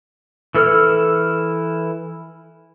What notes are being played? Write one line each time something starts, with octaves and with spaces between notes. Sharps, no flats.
E3 E4 A4 E6 F6